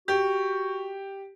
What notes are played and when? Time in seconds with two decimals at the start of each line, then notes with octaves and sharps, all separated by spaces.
0.08 F#4 G4